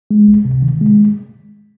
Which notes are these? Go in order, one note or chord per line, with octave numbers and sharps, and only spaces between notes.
G#3
C#2
C3
D#3
G#3